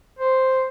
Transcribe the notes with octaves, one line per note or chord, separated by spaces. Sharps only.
C5